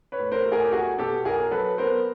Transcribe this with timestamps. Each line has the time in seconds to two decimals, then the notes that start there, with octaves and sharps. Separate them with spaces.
0.12 B4 C#5
0.19 A2
0.32 A#4 C5
0.46 A3
0.52 G#4 A#4
0.64 G4
0.72 B1 F#4 G#4
0.99 B2 G4 A4
1.25 B1 G#4 A#4
1.51 F#3 A4 B4
1.78 B3 A#4 C5